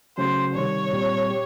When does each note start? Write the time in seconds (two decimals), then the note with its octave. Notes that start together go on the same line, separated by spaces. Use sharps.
0.18 C#3 F#3 A3 C#4 F#4 C5
0.55 C3 D#3 G3 C#5
0.92 A#2 G3 C4
1.31 G4